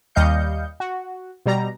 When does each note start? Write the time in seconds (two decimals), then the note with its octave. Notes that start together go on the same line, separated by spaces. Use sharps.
0.15 D#2 G3 D#5 F5 G6 C#7
0.80 F#4
1.46 B2 G3 A#5